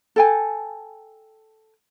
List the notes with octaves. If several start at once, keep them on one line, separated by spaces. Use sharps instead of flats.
A4 G5 G#5